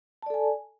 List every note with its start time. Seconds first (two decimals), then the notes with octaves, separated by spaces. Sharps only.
0.22 A5
0.26 D5
0.30 A4
0.34 G#5